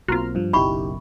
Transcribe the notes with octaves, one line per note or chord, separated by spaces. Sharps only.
B1 A#3 C4 F4 F#4 A#5 C6 F6
G2 F3
F#1 B1 F#2 D#4 E4 G4 B5 C#6